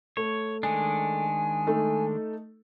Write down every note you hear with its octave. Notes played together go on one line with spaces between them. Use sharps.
A3 C#5
D#3 G#3 D4 G#5
A3 D#4 A4